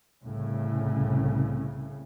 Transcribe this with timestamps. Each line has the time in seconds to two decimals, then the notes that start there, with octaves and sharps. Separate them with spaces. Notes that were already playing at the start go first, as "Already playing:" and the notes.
0.24 C2 A2 C#3